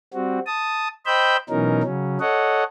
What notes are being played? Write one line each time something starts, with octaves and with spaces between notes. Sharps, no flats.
G3 C4 F#4
A5 D#6
C5 D#5 G5 B5 E6 G6
B2 E3 F#3 C#4 D#4 A#4
C#3 F#3 C#4
A4 C#5 D#5 F#5